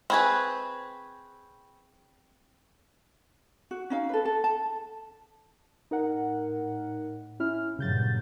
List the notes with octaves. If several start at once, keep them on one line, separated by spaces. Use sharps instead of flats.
C4 G#4 B4 B5 C#6 G#6
F#4
C#4 D#4 F5
A4 B4
A4
A5
A2 D#4 A#4 F#5
C#4 E4 F6
G2 A#2 C#3 F#3 G6 A6